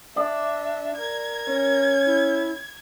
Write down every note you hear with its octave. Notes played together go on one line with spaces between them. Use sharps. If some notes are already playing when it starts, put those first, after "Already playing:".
D4 D5 E5
A#4 G#6
C#4
E4